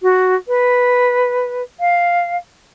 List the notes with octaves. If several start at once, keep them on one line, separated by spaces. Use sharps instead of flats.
F#4
B4
F5